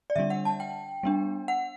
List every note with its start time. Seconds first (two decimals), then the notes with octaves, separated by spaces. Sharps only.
0.10 D5
0.16 D3 G3 D4 E5
0.30 F#5
0.45 A5
0.60 G5
1.03 G3 B3 D4
1.48 F#5